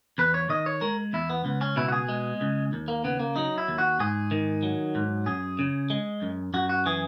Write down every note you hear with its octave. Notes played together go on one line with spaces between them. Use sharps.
E2 B4
C#5
D#3 D#5
C#5
G#3 A#4
E2 E4
B3
C#2 B3
C#4
B2 E4
F#4
G#4
G#3
C#2
D#2
A#3
C#3 B3
A#3
F#3 D#4
E4
D#2
F#4
G#2 G#4
D#3
F#3
G#2
F#2 G#4
C#3
G#3
F#2
F#2 F#4
F#4
E3 G#4